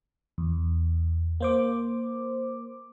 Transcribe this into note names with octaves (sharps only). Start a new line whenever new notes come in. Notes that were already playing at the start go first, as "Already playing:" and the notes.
E2
A#3 C5 D6